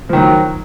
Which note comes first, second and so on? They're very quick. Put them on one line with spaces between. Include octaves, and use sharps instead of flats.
F3 D#3 F#3